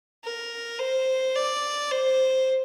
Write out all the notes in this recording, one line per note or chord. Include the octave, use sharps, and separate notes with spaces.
A#4
C5
D5
C5